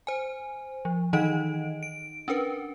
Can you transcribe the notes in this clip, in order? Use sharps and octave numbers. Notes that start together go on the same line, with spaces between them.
C5 G#5
F3
D#3 E3 D#4 D#5 D7
D7
C#4 D4 A#4 B4